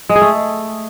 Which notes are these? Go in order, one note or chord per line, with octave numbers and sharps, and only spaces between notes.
G#3
G#4
A3